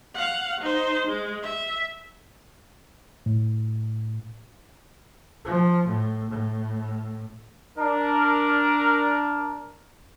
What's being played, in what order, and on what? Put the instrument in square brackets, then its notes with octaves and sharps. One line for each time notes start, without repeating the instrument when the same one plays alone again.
[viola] F5 F#5
D#4 C5
G#3
E5
[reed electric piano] A2
[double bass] F3
A2
A2
[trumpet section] D4 A#4